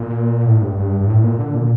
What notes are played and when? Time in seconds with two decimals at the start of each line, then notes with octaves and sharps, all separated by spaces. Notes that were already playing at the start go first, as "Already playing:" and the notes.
Already playing: A#2
0.45 A2
0.62 G2
0.77 G2
1.01 G2
1.07 A2
1.24 A#2
1.39 D3
1.55 A#2